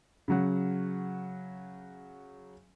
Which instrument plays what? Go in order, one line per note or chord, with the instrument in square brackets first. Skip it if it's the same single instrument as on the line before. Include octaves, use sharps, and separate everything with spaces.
[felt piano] C#3 F#3 F#5